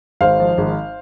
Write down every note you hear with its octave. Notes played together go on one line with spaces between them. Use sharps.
G#1 C5 F5
F3
G#1